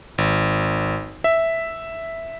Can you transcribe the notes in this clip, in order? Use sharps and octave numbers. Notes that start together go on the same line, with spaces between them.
G#1
E5